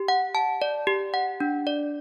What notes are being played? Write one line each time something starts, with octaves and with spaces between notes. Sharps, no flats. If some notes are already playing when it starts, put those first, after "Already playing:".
Already playing: G4
F#5
A5
D5
G4
F#5
D4
D5